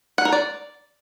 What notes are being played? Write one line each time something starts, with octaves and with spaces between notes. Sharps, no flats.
F#5
A#4
D5